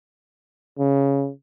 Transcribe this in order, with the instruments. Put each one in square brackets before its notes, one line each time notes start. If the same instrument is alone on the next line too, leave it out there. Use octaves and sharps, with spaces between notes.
[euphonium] C#3